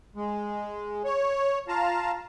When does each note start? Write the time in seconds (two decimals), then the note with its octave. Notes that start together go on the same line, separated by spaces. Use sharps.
0.16 G#3
1.05 C#5
1.68 F4 F5 A5 A#5